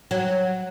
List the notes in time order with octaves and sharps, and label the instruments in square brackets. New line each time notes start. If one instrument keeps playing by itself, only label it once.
[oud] F#3